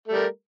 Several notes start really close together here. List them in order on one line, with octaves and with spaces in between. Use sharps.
A3 G3 A#4